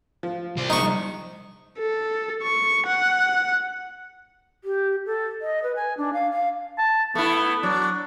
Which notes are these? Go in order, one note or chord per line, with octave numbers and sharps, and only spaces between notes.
F3
C2 C5
A#1 D#4 C#6
A4
C#6
F#5
G4
A4
D#5
B4
G#5
D4
F5
F5
A5
A3 B3 E4
F#3 D4